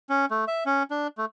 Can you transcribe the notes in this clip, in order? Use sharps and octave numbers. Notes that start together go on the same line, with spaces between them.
C#4
A3
E5
C#4
D4
A3